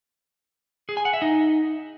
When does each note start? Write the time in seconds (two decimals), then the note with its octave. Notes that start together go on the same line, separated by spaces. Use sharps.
0.89 G#4
0.97 G#5
1.05 F#5
1.13 E5
1.22 D#4